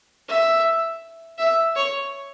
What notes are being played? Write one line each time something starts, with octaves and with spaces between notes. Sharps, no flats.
E5
E5
C#5